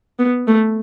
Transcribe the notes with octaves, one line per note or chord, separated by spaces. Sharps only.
B3
A3